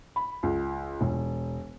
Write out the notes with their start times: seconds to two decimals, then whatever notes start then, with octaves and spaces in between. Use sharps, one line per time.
0.16 B5
0.43 C#2
1.01 E1